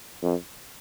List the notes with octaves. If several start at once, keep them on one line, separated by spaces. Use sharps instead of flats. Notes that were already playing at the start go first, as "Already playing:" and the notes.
F2